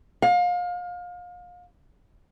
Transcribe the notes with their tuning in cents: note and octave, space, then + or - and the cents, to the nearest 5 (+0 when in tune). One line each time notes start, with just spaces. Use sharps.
F5 +30